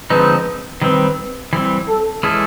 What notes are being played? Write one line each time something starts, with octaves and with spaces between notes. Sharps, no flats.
D3 F3 G#3 C4 D#4 B4
D#3 G3 C4 B4
E3 G3 C4
A4
E3 G#3 C#4 E4 A4